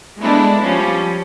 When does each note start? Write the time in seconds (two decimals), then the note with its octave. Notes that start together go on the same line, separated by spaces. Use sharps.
0.20 G#3 A3 B3 D4 E4
0.61 F3 G3 C#4